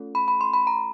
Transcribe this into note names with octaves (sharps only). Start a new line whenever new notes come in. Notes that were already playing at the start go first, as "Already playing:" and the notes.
Already playing: A3 C#4 F4 A4
B5
B5
C6
B5
A#5